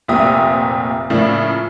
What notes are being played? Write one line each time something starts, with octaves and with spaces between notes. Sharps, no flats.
F1 A#1 A#2 G4 E5 D#6
A2 C#3 F3 A#3 D4 E4